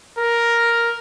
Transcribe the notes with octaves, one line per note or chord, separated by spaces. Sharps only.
A#4